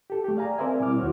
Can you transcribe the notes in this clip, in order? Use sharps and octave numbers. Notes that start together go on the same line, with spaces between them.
G4 A4
A3 G4
G#4 D5 F5 G#5 A#5
C4 A#4 C5 D5 E5 G#5
B2 G3 C4 E4 D6 F6
D#2 E4 F#4 C5 C#5